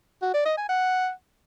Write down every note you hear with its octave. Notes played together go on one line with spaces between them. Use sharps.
F#4
D5
D#5
G#5
F#5